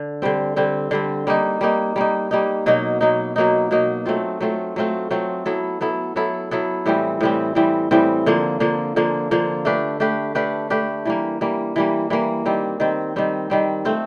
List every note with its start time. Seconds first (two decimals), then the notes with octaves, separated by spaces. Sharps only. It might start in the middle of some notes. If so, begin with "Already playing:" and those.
Already playing: D3
0.22 D3 G3 C4
0.56 D3 G3 C4
0.91 D3 G3 C4
1.27 G3 A#3 D#4
1.61 G3 A#3 D#4
1.96 G3 A#3 D#4
2.31 G3 A#3 D#4
2.66 B2 F#3 A#3 D#4
3.01 B2 F#3 A#3 D#4
3.36 B2 F#3 A#3 D#4
3.71 B2 F#3 A#3 D#4
4.06 F#3 A3 C4 F4
4.41 F#3 A3 C4 F4
4.76 F#3 A3 C4 F4
5.11 F#3 A3 C4 F4
5.46 F#3 B3 E4 A4
5.81 F#3 B3 E4 A4
6.16 F#3 B3 E4 A4
6.51 F#3 B3 E4 A4
6.86 A2 E3 G3 C4
7.21 A2 E3 G3 C4
7.55 A2 E3 G3 C4
7.91 A2 E3 G3 C4
8.26 D3 F3 A#3
8.60 D3 F3 A#3
8.96 D3 F3 A#3
9.31 D3 F3 A#3
9.65 A3 D4 G4 B4
10.00 A3 D4 G4 B4
10.35 A3 D4 G4 B4
10.70 A3 D4 G4 B4
11.05 E3 G3 A#3
11.41 E3 G3 A#3
11.76 E3 G3 A#3
12.10 E3 G3 A#3
12.46 D#3 G3 C4
12.80 D#3 G3 C4
13.16 D#3 G3 C4
13.50 D#3 G3 C4
13.85 A3 C4 F4